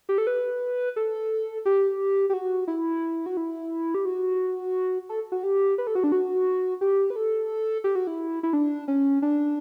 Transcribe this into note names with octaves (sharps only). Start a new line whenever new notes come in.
G4
A4
B4
A4
G4
G4
F#4
E4
F#4
E4
G4
F#4
A4
F#4
G4
B4
A4
F#4
D4
F#4
G4
B4
A4
G4
F#4
E4
E4
D4
C#4
D4